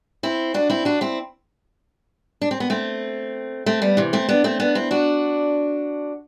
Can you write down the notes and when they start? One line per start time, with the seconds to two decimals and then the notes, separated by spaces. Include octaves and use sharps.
0.23 C4 E4
0.54 D4 F#4
0.70 C4 E4
0.85 D4 F#4
1.01 C4 E4
2.42 D4
2.51 C4
2.60 B3
2.70 A3 C4
3.66 A3 C4
3.82 G3 B3
3.97 C3 E3
4.13 A3 C4
4.29 B3 D4
4.44 A3 C4
4.60 B3 D4
4.75 C4 E4
4.91 D4 F#4